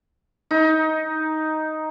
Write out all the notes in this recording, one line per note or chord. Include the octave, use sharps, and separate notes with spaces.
D#4